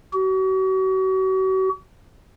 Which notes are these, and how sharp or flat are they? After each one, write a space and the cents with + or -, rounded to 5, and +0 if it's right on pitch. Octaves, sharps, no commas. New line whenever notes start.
F#4 +40